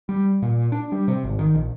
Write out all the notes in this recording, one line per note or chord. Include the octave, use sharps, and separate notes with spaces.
G3
A#2
D4
G3
C3
G#1
D#3
A#1